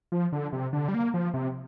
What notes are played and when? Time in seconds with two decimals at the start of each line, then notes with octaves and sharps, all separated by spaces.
0.12 F3
0.32 D3
0.53 C3
0.73 D3
0.88 G3
0.94 A#3
1.14 F3
1.34 C3